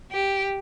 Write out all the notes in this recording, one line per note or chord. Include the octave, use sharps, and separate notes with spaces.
G4